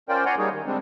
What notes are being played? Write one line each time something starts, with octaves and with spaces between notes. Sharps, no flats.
C#4 F4 A#4 C5 D5 G5
C#5 D5 F#5 G#5 A#5 C6
G3 A#3 D#4 G#4 C#5
D#3
D3 G3 G#3 C4 D4